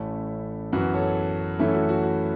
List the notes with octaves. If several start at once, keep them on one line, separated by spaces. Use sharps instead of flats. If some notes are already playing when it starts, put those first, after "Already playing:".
Already playing: A1 A2 A3 C#4 E4 A4
F#2 E3 B3 F#4 B4
A4 C#5
F#2 E3 A3 C#4 E4 A4
F#4
F#4
F#4